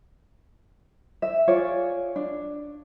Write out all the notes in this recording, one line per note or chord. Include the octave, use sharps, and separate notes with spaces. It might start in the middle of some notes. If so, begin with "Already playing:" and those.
E5
F4 G#4 C#5 D5
D4